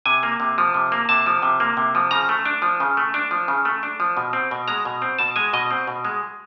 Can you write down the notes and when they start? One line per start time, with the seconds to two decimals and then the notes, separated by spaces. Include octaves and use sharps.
0.06 C3 G#5
0.23 A#3
0.40 C3
0.58 F3
0.74 C3
0.92 A#3
1.09 C3 A5
1.26 F3
1.42 C3
1.60 A#3
1.77 C3
1.95 F3
2.11 C#3 A#5
2.29 A3
2.45 D4
2.62 F3
2.80 C#3
2.97 A3
3.14 D4
3.31 F3
3.48 C#3
3.65 A3
3.83 D4
4.00 F3
4.17 B2
4.33 C4
4.51 B2
4.68 G#3 A#5
4.85 B2
5.02 C4
5.19 B2 A5
5.36 G#3 G#5
5.53 B2 D#5
5.71 C4
5.87 B2
6.05 G#3